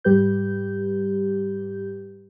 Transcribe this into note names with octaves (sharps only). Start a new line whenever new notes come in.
G#2 G3 G4 B4 G6